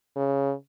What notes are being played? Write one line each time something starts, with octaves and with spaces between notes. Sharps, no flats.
C#3